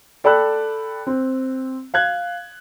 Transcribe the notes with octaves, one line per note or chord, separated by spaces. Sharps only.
A4 D5 G5 B5 E6 F#6
C4
F5 F#6 G#6